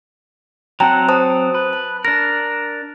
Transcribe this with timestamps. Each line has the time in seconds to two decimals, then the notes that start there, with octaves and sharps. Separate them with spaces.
0.80 F#3 C4 F#5 G5 A5 A#5
1.08 C5 A5 D#6
1.54 B4
1.73 A5
2.05 D4 A#4 A#6